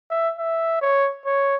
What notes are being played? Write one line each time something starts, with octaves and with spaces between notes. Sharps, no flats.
E5
E5
C#5
C#5